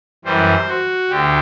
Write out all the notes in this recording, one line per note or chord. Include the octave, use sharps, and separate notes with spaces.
F#2 E3 G3 C5
F#4
D2 D3 G4